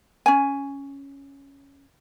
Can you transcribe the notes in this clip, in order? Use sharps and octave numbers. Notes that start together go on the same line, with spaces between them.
C#4 G#5